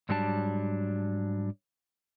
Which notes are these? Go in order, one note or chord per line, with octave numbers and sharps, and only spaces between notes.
G#2 F#3 G3 D4 A5